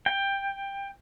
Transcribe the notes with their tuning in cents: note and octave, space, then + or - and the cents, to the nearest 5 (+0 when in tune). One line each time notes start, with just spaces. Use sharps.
G5 +15